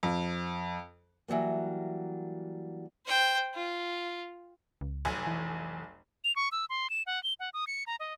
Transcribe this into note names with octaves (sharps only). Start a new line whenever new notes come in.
F2
E3 F#3 G3 A#3
C5 G5
F4
C#2
F1 B1 G#5
E3
F7
C#6
E6
C6
E7
F#5
G7
F#5
D#6
C#7
A#5
D#5